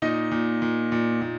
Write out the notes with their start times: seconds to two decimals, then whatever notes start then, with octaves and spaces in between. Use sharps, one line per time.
0.02 A#2 D#4 D#5
0.32 A#2
0.62 A#2
0.92 A#2
1.22 A#2